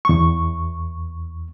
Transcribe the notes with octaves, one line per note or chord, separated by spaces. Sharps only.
E2 C#6